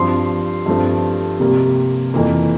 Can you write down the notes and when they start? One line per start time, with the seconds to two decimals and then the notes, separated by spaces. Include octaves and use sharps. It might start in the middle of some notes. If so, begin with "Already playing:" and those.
Already playing: G2 F3 C4 C6
0.66 G2 F3 A3 C4
1.40 C3 G3 A#3
2.14 F2 E3 A#3